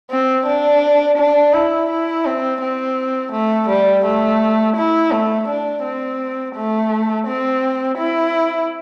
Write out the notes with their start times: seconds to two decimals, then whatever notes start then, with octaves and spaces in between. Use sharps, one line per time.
0.11 C4
0.47 D4
1.18 D4
1.53 E4
1.90 E4
2.26 C4
2.61 C4
3.32 A3
3.69 G3
4.05 A3
4.77 E4
5.12 A3
5.48 D4
5.84 C4
6.55 A3
7.27 C4
7.98 E4